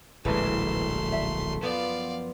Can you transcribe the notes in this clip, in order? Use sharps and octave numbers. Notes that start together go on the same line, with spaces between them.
D1 A#1 E3 G#3 A3 C6
E5
F#2 F3 B3 D5 F5